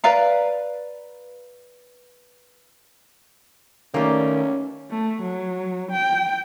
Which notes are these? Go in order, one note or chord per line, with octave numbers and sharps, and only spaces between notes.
B4 D5 F5 A#5
D#3 G3 A3 A#3 C#4
A3
F#3
G5